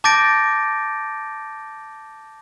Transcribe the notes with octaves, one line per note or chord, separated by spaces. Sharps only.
A5 D6 G6 A6 A#6 D7